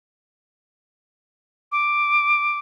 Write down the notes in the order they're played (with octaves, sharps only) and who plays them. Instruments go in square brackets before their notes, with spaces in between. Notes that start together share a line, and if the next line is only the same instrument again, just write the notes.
[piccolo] D6